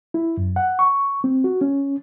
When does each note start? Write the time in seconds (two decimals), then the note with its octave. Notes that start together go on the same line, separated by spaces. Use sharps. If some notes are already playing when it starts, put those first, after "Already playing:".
0.14 E4
0.37 F#2
0.56 F#5
0.79 C#6
1.24 C4
1.44 F#4
1.61 C#4